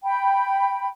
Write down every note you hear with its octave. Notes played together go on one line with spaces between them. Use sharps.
G5 B5